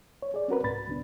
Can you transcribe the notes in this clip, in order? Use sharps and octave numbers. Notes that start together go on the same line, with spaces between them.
C#5
G#4 D5
C4 C#4 F#4 A#4 B4
C2 G#2 B5 A6
D2 B3 D4